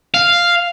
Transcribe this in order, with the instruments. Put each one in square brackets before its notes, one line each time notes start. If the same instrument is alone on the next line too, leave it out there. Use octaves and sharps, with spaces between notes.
[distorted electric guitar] F5